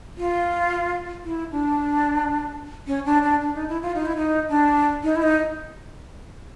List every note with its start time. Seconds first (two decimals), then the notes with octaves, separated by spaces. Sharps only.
0.17 F4
1.25 E4
1.51 D4
2.87 C#4
3.06 D4
3.23 D4
3.41 D4
3.55 D#4
3.69 E4
3.82 F4
3.95 D#4
4.05 E4
4.16 D#4
4.49 D4
5.03 D#4
5.16 E4
5.22 D#4